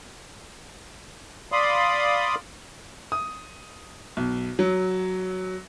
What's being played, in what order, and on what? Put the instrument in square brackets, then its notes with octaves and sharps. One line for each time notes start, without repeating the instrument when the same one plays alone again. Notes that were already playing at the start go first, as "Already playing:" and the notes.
[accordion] D5 F5 B5 C6 D6 D#6
[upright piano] D#6
B1
F#3